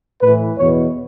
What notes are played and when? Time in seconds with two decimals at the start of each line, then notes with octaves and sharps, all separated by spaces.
0.22 A2 E3 B4
0.58 E2 B2 C#5